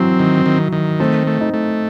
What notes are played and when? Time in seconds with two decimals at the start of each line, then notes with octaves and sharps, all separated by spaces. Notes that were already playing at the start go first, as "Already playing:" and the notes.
Already playing: E3 F#3 C4
0.19 D#3
0.46 D#3
0.72 D#3
1.00 A3 C4
1.27 A3
1.41 D#4
1.54 A3